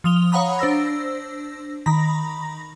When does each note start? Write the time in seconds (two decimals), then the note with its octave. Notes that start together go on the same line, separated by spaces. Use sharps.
0.04 F3 D#6 F7 G7
0.32 C#5 F5 F#5 A#5 B5 D#6
0.59 D4 C5 E6 A#6
1.86 D#3 A#5 B5 A#6